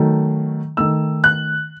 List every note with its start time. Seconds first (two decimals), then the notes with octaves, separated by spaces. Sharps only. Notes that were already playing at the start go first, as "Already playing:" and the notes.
Already playing: D#3 F#3 A3
0.77 D#3 A3 E6
1.24 F#6